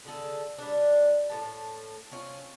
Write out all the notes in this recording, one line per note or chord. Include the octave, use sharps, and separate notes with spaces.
D3 G#4 A4
G3 D4
A2 B3 A5
C4 C#4 F4